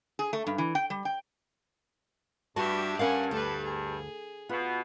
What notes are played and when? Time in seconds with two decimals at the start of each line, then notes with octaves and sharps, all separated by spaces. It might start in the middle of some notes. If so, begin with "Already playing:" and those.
0.19 G#4
0.33 A3
0.47 G2
0.58 E3
0.75 G5
0.90 G3
1.05 G5
2.56 G2 G3 F#4 G4 E5 A5
2.99 G2 C#4 A#4 F5 F#5 G#5
3.31 D2 A4 B4
3.65 G#4
4.49 B2 B3 F4